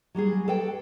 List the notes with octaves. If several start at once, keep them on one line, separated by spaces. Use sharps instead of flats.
F#3 G3 F#4 G#4
A4 B4 D5 G5